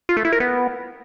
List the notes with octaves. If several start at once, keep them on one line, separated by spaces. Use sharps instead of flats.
F4
A3
E4
A#4
B3